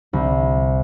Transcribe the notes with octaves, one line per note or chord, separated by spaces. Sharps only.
C2